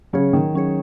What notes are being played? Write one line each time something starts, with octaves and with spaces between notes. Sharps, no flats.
C#3 F#3 C#4 G#4 C#5
D#3
F#3 C#4 G#4 C#5